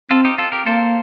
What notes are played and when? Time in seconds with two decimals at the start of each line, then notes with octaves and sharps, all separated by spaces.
0.11 C4 F4 A4
0.25 D#4 G4
0.38 F4 A4
0.52 G4 A#4
0.66 A#3 A4 C5